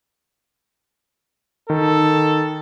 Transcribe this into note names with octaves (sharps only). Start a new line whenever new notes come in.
D#3 A4